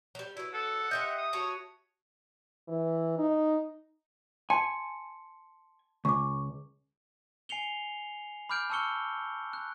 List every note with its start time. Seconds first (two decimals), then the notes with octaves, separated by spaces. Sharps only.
0.15 F#3 G3
0.37 F#3 B3 E4
0.54 A4 F#5
0.91 G4 C5 D#5 E5 G6
1.18 D#6
1.33 A3 F#4 C#5
2.68 E3
3.18 D#4
4.50 G#5 A5 C6 C#7
6.05 C#2 C#6 D6
7.49 G#5 C7 C#7 F7 G7
8.49 B5 D6 F6 G6 D7
8.70 A5 C#6 E6 F6 C#7 G7
9.53 F#6